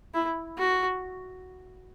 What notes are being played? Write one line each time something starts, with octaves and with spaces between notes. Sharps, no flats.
E4
F#4